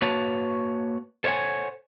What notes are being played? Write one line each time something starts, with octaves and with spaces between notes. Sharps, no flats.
A#3 F#4 B4 C#5 A5
A4 C5 C#5 D#5 F#5 G#5